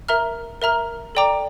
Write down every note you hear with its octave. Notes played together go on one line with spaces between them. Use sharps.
A#4 E5 A#5 F6
A#4 E5 A#5 F6
A4 D5 G5 A#5 D6